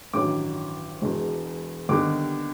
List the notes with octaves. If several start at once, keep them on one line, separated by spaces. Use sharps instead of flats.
A1 G2 D#3 F#3 D6
E1 E2 B2 G#3
D#2 D3 G3 B3 D#4 D6